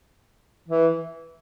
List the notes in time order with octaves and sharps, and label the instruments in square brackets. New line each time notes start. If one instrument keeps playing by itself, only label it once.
[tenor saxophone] E3